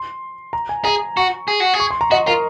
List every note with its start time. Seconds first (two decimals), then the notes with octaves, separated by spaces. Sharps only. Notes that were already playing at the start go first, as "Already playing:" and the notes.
Already playing: C6
0.53 A#5
0.69 G#5
0.85 G#4 A#5
1.17 F#4 C#6
1.48 G#4
1.60 F#4
1.74 G#4
1.80 C#6
1.91 C6
2.01 A#5
2.11 F#4 D#5
2.27 F4 A#4